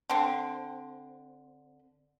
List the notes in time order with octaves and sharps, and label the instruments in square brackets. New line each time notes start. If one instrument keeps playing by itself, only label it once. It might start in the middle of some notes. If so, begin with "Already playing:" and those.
[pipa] D3 C4